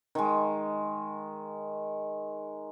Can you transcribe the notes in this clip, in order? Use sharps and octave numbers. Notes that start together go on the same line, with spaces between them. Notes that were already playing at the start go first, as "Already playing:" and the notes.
D#3 G#3